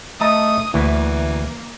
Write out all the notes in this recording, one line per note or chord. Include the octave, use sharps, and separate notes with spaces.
A3 D#5 A5 A#5 D#6
D2 E3 A#3